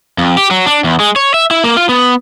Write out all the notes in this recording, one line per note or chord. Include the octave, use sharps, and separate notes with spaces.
F2
G4
F#3
D4
E2
G#3
C#5
E5
E4
A#3
F4
B3